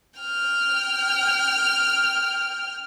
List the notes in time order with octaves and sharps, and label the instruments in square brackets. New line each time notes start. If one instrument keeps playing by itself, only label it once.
[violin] G5 F6